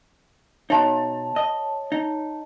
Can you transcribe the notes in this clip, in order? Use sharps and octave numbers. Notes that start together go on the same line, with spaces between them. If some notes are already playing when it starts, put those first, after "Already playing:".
B2 D#4 C#5 A5
D#5
D#4